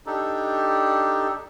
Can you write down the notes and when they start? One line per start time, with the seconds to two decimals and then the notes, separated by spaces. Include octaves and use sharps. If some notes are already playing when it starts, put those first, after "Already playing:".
0.06 D4 D#4 G4 A4